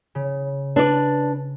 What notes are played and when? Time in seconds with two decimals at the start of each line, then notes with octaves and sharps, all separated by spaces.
0.15 C#3
0.76 D4 B4 D5